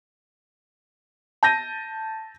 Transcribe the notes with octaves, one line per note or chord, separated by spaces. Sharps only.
A5 G6 A#6 D#7